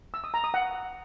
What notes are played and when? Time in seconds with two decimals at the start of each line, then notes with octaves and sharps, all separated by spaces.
0.14 E6
0.24 D#6
0.34 A#5
0.44 D#6
0.54 F#5